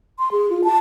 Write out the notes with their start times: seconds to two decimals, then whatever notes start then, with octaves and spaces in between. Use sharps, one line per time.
0.19 C6
0.32 G#4
0.50 F4
0.64 A5